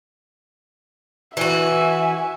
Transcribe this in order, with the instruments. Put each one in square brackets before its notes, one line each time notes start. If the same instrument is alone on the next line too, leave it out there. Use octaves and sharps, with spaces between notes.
[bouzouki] E3 F#4 [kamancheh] E5 G#5